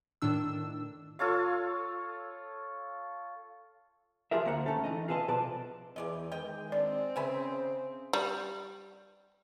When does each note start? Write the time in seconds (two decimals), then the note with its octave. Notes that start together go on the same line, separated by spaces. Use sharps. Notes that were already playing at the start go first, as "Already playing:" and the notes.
0.22 A2 D#3 D4 E6
1.19 F4 A4 C#5 F5
4.31 F3 F4 G4 G#4 A#4 E5
4.45 D2 A#3 C5 F#5
4.66 D#3 A3 C#4 A4
4.84 E3 D#4 D#5
5.08 F4 G#4 A4 B4 D#5
5.28 C2 B2 F3 B4 D5 A5
5.96 E2 G#4 D5 D#5
6.32 D#3 G#3 D#5 G5
6.72 C4 D4 D5
7.16 C#3 G#4 C5 E5 G#5 B5
8.13 G3